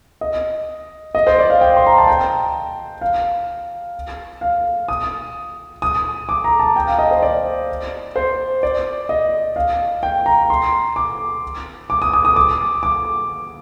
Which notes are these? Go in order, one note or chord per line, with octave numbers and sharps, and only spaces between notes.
D#5
D#5
C5
D5
F5
G5
C6
A#5
A5
G5
F5
F5
D#6
D#6
D6
A#5
A5
G5
F5
D#5
C5
D5
C5
D5
D#5
F5
G5
A#5
C6
D6
D6
D#6
D#6
D#6
D6
D6